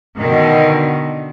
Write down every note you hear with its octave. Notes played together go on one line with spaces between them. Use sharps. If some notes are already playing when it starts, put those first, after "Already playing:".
B2 D3 D#3